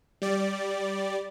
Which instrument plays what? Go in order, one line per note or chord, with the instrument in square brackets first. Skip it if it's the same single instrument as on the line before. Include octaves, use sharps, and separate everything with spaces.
[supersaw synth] G3 D5